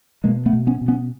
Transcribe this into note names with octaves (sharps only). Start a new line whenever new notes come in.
B2 G#3 A#3
A3 B3
B2
B3 C#4
B2
B3 C#4